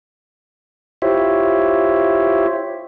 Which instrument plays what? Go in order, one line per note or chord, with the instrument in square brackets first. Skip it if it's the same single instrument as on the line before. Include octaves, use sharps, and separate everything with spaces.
[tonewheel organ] E4 F4 G4 C5 C#5 E5